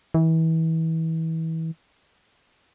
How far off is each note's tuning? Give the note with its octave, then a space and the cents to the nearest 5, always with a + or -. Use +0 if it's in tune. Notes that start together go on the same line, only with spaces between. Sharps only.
E3 -30